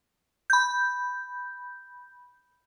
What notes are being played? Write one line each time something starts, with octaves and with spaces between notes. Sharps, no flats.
B5 G6